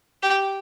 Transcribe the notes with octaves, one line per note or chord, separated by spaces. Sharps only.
G4